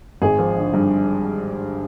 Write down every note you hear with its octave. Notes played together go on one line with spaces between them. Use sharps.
G#1 G#4
F3
D3
G2